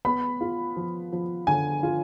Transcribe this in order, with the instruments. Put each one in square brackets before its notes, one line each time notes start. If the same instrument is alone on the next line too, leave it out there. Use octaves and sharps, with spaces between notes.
[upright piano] B3 B5
F4
F3
F3
D3 G#5
F4